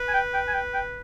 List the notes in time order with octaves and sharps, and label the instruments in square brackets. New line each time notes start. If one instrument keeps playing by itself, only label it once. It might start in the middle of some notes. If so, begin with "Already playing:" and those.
Already playing: [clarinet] B4
[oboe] G#5
G5
G5
G#5
G5
G5